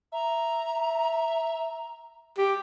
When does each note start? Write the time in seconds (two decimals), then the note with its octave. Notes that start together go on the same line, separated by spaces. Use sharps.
0.13 E5 A#5
2.38 G4